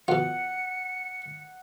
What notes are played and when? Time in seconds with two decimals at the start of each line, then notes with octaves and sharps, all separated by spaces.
0.08 B2 F4 F#5 C#7